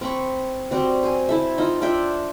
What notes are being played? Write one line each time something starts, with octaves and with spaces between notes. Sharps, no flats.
C4 B5 C#6
G3 C4 F#4
C5 G#5
E4 A4 E5
D#4 F4
D4 F4 E5 G5